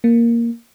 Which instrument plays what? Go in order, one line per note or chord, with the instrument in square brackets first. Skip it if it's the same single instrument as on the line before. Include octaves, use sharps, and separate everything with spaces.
[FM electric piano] A#3